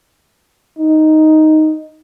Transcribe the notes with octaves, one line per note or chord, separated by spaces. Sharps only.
D#4